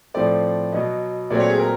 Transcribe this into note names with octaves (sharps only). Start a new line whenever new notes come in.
A2 F3 A3 C4 D5
B2 F#3 B3 D#5
A#2 F#3 A3 C4 D5
C#5
G#4
A#4